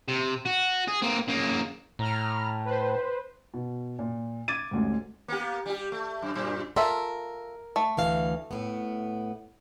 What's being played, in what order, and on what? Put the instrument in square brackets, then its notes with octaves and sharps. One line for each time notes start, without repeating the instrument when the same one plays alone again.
[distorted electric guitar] C3
F#4
G#4
A#3 C4
C#3 A#3
[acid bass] A2 [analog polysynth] A#5 F6
[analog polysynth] B4 C5
[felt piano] B2
A#2
D6 G#6 A6 D#7
A1 D2 G#2
[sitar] A#3 B3 G4
G3 G4
A3
F#2
F#2 A#2
[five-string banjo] F4 A4 E5 [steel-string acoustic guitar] A#4
[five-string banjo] A3
[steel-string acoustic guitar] D2 E3 F5
A2 B3